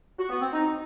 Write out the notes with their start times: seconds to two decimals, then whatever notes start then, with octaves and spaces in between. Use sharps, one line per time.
0.18 F#4
0.29 B3
0.40 C4
0.52 D#4